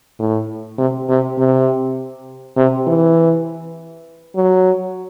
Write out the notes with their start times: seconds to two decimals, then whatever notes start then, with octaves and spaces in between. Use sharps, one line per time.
0.19 A2
0.78 C3
1.09 C3
1.38 C3
2.57 C3
2.87 E3
4.36 F#3